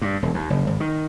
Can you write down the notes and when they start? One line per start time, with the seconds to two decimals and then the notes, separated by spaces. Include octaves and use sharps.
0.02 G2
0.22 E1
0.34 D#2
0.50 F#1
0.67 G#1
0.80 D#3